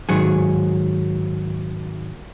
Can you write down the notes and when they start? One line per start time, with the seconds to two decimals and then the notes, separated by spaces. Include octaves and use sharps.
0.09 G#2 D#3 F#3 G#4